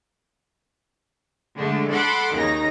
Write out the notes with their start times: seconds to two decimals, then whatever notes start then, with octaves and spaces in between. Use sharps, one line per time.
1.57 D3 G#3 A3 D4
1.91 A4 F#5 B5 C6 D6
2.33 D#2 C#3 D#4 A#5 A#6